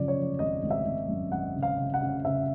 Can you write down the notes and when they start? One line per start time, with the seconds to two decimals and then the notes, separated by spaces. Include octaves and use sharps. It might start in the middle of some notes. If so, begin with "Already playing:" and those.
Already playing: F#2 C#3 F3 D5
0.08 C#5
0.16 F3
0.39 G#1 D#5
0.63 G#1
0.71 E5
0.85 G#1
1.08 F#2
1.32 G#1 F#5
1.55 C#3
1.63 F5
1.78 C#3
1.94 F#5
2.02 C#3
2.25 C#3 E5